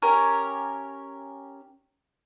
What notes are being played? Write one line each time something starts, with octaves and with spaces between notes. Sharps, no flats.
C#4 G4 A#4 C#5